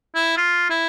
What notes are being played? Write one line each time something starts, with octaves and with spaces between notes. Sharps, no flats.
E4
F4
E4